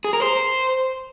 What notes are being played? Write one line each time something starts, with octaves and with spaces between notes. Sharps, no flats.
G#4
A#4
C5